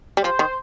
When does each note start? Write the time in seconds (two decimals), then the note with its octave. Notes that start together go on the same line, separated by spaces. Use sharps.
0.17 G3
0.23 F3 C5
0.39 D#3